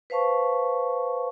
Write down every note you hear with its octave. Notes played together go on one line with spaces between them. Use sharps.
B4 C5 F5 A5 C#6